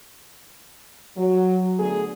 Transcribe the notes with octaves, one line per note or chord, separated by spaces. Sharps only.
F#3
D3 A3 B3 G#4